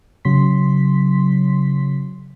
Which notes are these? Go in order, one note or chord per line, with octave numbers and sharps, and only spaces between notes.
C#3 F#3 C6 B6